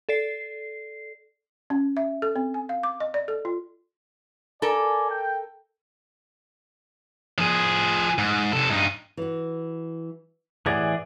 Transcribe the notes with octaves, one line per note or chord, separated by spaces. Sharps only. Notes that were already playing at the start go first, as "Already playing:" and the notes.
A4 D5 C7
C#4
E5
A4
C4
G#5
F5
D6
D#5
D5
A4
F4
A4 A#4 D5 G#5
G5
F3 G#4
G#2
C3 A4
G2 D#4
E3 F#4
A2 E3 G4 G#4 D5 F#5